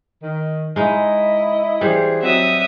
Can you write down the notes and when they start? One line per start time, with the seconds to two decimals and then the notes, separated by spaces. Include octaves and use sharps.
0.22 D#3
0.76 G#3 D#4 E4 D#5
1.81 E3 G3 G#4 C5
2.23 F#3 C4 E5 D#6